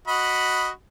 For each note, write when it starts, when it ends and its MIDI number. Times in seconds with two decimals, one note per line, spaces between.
0.07 0.70 66
0.07 0.70 75
0.07 0.70 83